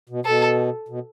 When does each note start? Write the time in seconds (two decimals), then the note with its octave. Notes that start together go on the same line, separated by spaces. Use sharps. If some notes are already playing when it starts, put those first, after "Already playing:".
0.09 B2
0.25 B2 A4
0.88 B2